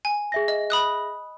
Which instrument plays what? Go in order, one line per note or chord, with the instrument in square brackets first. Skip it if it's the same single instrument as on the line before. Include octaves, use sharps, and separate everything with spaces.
[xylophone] G#5
[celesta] G#4 E5 A#6
[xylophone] D#5
B5 D#6 F#6